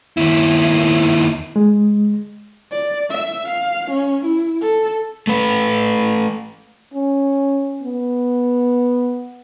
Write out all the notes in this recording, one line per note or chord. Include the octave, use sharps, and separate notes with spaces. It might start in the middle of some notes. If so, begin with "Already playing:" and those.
D#2 E4
G#3
D5
E5
F5
C#4
E4
A4
A3 B4
C#4
B3